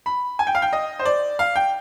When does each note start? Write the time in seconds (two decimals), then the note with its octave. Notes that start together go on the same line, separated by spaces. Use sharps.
0.06 B5
0.39 G#5
0.47 G5
0.55 F5
0.62 G5
0.73 D#5
0.99 C5
1.05 D5
1.39 F5
1.56 G5